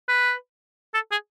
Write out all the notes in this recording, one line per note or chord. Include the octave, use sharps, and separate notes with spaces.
B4
A4
G#4